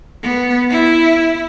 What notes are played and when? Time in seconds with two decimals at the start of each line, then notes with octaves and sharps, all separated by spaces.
0.23 B3
0.71 E4